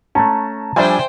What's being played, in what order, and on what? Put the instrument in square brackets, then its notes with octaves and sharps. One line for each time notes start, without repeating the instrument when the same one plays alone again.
[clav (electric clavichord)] A3 C#4 [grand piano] A5 A#5
[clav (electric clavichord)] F3 G3 D4 [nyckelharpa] C5 G5 [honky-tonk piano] D5 E5 G#5